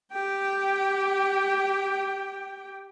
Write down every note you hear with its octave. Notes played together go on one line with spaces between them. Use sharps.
G4 G5